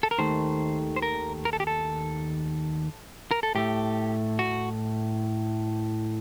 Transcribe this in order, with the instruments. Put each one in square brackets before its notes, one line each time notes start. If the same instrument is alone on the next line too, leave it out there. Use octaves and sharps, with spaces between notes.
[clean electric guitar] A4
A#4
D#2 D#3 A3 C5
C5
A#4
A#4
A4
G4
A4
A#4
A4
A2 A3 G4
F#4